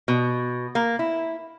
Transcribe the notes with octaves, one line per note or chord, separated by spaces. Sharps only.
B2
A#3
E4